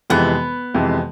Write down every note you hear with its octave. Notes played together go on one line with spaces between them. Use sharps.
F2 C3 E3 G#3 B3
F2 C3 E3 G#3